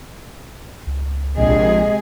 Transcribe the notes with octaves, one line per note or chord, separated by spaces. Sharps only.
C#2
A#1 C3 G#3 G#4 D#5